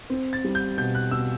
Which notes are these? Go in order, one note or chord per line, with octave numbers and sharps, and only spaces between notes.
C4
A6
G3
G6
B2 G6
F#6
B2 E6